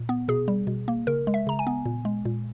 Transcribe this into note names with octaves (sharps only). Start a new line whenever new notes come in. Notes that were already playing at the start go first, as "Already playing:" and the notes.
Already playing: A#2
B3
B2 G#4
G3
B2
A#3
C#3 A#4
G#3
E5
C#3 A#5
G#5
B3
A#2
G#3
A#2